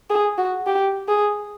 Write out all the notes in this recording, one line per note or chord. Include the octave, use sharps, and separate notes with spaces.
G#4
F#4
G4
G#4